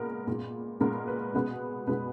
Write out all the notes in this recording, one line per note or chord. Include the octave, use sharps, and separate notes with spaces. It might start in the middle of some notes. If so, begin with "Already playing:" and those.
Already playing: A#2 G#3 B3 A#4
A#2 G#3 B3
A#2 G#3 B3 A#4
B4
B2 G#3 B3 B4
B2 G#3 B3 B4